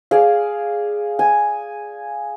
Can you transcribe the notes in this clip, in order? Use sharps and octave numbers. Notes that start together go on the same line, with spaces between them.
G#4 D5 F5
G#5